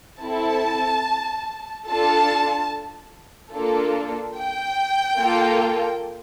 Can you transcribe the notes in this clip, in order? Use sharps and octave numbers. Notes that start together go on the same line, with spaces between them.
C4 E4 A4 A5
D4 F4 A4 A5
A#3 D4 F4 A4
G5
A#3 F4 A4